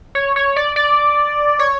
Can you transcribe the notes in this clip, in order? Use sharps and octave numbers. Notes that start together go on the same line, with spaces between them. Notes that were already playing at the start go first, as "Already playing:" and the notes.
C#5
C#5
D5
D5
C#5